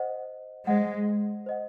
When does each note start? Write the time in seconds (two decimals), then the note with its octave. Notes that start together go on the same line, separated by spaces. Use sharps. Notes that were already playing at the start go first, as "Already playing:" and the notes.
Already playing: C5 D#5 F#5
0.67 G#3 C5 D#5 F#5
1.46 C5 D#5 F#5